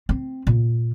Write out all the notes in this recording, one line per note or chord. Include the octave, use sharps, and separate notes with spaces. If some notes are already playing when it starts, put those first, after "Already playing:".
C4
A#2